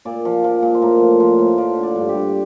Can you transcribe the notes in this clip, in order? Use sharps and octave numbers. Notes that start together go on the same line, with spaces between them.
A#2 D5
F3
F3
A#2
C5
A2 A#4
F3
F3 C5
A2
F3 D5
D3
D5
G2
G4
G2